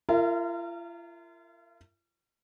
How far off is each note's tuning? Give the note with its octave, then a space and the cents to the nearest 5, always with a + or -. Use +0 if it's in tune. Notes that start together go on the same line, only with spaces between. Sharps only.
F4 -40 A#4 -30 E5 +0